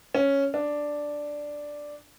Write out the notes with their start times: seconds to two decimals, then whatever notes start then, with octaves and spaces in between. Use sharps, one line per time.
0.15 C#4
0.54 D4